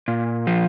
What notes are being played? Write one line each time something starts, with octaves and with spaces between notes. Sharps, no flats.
A#2
F3